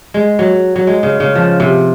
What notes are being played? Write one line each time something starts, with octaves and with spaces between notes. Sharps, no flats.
G#3
F#3
F#3
G#3
C#3
C#3
F3
C3